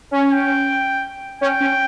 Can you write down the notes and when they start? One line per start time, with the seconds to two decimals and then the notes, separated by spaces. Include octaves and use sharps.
0.11 C#4
0.30 G5
1.41 C#4 G5
1.60 C#4